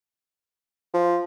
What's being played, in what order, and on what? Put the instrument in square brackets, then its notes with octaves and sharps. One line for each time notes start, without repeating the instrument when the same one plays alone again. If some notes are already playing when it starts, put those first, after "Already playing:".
[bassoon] F3